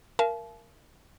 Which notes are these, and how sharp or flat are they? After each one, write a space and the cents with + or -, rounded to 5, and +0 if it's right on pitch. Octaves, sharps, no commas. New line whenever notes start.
A#4 +0 F5 -45 A5 -40